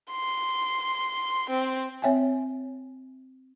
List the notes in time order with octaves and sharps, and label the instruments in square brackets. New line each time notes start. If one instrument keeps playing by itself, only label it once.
[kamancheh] C6
C4
[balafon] C4 C#5 E5 G5 G#5